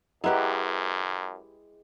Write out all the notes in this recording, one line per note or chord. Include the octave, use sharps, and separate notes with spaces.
F#2 G#3 E4 G4 B4 D#5 F#5 A#5